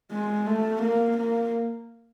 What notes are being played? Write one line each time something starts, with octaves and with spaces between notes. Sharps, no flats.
G#3
A3
A#3
A#3